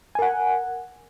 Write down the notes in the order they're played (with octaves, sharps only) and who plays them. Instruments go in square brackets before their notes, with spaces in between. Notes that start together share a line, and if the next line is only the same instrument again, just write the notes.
[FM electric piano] G#5
A#4
F#5